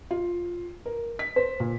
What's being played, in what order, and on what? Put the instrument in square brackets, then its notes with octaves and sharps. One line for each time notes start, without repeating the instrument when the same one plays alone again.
[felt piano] F4
A#4
B6
C5
A#2